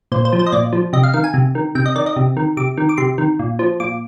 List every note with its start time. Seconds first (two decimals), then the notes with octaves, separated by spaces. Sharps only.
0.12 A#2 C5
0.25 C5
0.33 F3
0.39 C5
0.47 D#5
0.52 A#2 D5
0.73 F3
0.93 C3 D#5
1.04 F5
1.14 D#3 F5
1.24 G#5
1.34 C3
1.55 D#3
1.75 C3 G5
1.86 D#5
1.95 D#3 D5
2.06 D#5
2.16 C3
2.37 D#3
2.57 C3 D6
2.78 D#3
2.89 D6
2.97 C3 C6
3.18 D#3
3.39 A#2
3.59 F3
3.80 A#2 D6